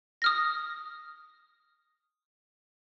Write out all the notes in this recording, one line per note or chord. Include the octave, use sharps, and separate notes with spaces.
D#6 F6 A#6